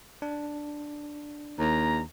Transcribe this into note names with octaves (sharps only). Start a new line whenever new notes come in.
D4
D#2 A#5